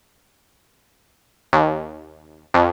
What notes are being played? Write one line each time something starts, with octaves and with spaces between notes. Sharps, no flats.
D#2
F2